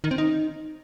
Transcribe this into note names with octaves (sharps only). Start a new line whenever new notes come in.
D#3
C4
D#4